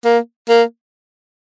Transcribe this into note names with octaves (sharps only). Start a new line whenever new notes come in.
A#3
A#3